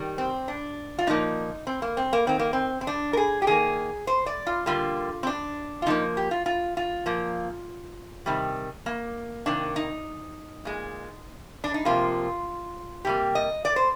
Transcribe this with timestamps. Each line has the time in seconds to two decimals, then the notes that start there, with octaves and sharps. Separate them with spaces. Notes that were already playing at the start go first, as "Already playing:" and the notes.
Already playing: D#3 G3
0.18 C4
0.48 D4
0.99 F4
1.07 A#2 F3 A#3 D#4
1.67 C4
1.82 A#3
1.97 C4
2.13 A#3
2.27 D#3 A#3 C4
2.39 A#3
2.53 C4
2.81 C4
2.87 D4
3.13 A#4
3.17 G#4
3.42 G4
3.47 D#3 A#3 G#4
4.07 C5
4.26 D5
4.47 F4
4.66 D3 G3 A#3 F4
5.23 C4
5.27 D4
5.82 F4
5.86 D3 F3 A#3 D#4
6.17 G4
6.31 F4
6.46 F4
6.77 F4
7.06 A#2 F3 A#3
8.26 C3 D#3 G3
8.86 A#3
9.46 C3 D#3 A#3 D4
9.76 D#4
10.65 A#2 G#3
11.64 D4
11.74 D#4
11.85 C3 F3 A#3 F4
13.05 C3 G3 A#3 G4
13.35 D#5
13.65 D5
13.76 C5